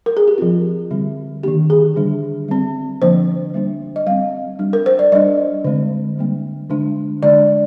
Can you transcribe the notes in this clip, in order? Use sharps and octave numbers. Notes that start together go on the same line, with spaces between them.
A#4
G#4
G4
F3 C4 F4
D3 G3 C4
D#3 A#3 D4 G4
G#4
D3 G3 D4
G3 C4
D3 F3 A#3 D4 C5
G3 A#3 D4
D#5
G3 C4 F5
G3 D4
A#4
C5
D5
G3 D4 D#5
D3 G#3 C4
D3 G3 A#3 D4
D3 G#3 D4
D3 G#3 D4 D5